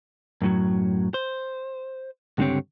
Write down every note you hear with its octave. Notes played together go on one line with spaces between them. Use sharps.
F#2 A2 F#3
C5
C#2 G2 D3 C4 G4 C#5